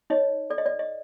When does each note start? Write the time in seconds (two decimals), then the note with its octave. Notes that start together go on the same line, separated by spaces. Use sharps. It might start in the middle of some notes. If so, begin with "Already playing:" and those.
0.10 D#4 C#5 D#5
0.50 A4 D5
0.58 D#5
0.66 D5
0.79 D#5